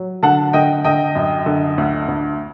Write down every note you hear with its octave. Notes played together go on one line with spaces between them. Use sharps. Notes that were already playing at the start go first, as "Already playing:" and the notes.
Already playing: F#3
D3 F#5 A5
D3 D#5 G5
D3 D#5 G5
F#2
D3
D2
D2